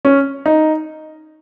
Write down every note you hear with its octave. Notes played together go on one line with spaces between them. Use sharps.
C#4
D#4